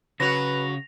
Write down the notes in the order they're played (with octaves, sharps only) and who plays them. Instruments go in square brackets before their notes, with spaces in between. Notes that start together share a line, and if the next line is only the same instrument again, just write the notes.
[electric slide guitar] C#3 [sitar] F#3 F#4 [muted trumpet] B4 [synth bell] A#6 F7